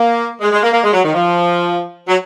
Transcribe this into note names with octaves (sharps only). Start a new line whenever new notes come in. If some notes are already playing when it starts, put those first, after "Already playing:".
Already playing: A#3
G#3
G#3
A#3
A#3
G#3
F#3
D#3
F3
F#3